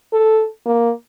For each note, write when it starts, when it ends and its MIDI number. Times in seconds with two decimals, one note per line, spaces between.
0.13 0.45 69
0.66 0.91 58